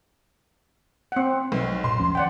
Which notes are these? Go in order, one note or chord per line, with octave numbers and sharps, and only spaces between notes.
C4 F#5
B1
A#2 C6
D#2 F3 C#4
D#3 E3 D5 F#5 G5